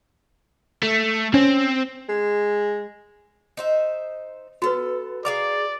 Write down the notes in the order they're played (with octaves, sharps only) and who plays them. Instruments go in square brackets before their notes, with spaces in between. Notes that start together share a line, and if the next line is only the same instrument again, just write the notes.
[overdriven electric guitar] A3
[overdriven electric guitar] C4 [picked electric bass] C#4
[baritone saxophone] G#3
[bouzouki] D#4 C5 E5
[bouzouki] B3 A4 [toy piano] F#4 B4
[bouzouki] G#4 F5 A#5 [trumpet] D5 [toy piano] D6